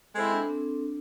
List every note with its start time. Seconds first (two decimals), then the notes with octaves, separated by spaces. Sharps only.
0.15 G#3 C4 E4 A4
0.32 D4
0.49 C4
0.82 D4